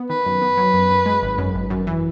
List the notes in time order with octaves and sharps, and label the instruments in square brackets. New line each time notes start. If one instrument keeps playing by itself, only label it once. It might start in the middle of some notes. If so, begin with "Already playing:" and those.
Already playing: [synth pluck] B3
[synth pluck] D#3 [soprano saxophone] B4
[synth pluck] F#2
B3
F#3
F#2
F#2
G#3
G#1
F#2
G#1
F#2
E3